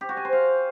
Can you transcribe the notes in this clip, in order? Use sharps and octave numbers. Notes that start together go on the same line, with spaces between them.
G4
F#4
G#5
C5
F5